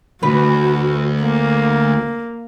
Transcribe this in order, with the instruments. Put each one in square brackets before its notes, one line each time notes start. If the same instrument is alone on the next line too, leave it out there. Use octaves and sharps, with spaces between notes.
[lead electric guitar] D2 [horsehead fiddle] F#4 [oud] B4
[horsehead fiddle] A#3